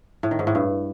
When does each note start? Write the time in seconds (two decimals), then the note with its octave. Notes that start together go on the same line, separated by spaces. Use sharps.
0.23 A2
0.31 D#3
0.39 G#2
0.47 A2
0.55 G2